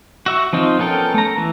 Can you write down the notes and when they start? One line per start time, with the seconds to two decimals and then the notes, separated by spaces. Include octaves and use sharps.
0.26 F#4 E5 C#6
0.53 F3 C4 D#4 F4
0.79 B3 C#4 A4 A#4 G5
1.14 A3 A#5
1.37 E3